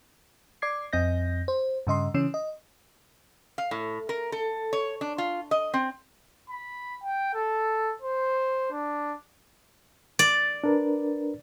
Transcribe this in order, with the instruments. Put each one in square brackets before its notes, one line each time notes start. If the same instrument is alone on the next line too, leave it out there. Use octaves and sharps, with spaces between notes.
[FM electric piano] D5 D6 G#6 C7
F2 C4 D#5 G6 A#6
C5
G2 C#3 D#5 C6
C#3 E3 C#4
D#5
[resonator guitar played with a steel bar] F5
A2
A#4
A4
C#5
D4
F4
D#5
C4
[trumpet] B5
G5
A4
C5
D4
[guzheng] D5
[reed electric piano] D4 A#4 B4